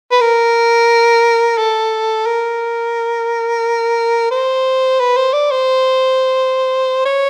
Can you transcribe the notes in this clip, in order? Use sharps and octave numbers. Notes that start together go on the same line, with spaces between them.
B4
A#4
A4
A#4
C5
B4
C5
D5
C5
C#5